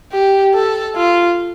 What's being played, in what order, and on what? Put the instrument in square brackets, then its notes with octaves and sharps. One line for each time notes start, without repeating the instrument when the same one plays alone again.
[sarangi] G4
A4
F4